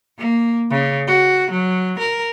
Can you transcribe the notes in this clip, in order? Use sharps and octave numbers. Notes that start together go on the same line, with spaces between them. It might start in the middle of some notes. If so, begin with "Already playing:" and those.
A#3
C#3
F#4
F#3
A#4